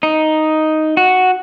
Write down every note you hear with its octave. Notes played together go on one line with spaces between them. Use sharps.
D#4
F#4